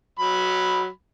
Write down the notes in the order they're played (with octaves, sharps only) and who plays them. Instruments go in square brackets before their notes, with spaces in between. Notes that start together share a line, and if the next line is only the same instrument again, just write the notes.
[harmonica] F#3 B5